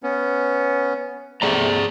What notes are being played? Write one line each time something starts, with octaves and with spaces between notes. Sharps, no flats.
B3 C#4
C3 A3 G#4 D5 A#5